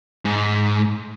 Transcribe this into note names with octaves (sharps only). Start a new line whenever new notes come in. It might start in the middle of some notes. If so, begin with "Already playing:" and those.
G#2